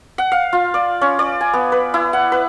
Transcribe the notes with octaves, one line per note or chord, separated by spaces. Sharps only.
F#5
F5
F4
D5
C#4
D5
G#5
B3
B4
E4
F#5
B4